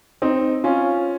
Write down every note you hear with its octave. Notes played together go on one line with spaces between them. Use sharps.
C4 D#4
C#4 F4